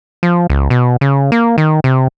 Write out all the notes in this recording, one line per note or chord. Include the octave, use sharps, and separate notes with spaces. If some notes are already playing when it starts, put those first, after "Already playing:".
F3
C#2
B2
C#3
A#3
D#3
C3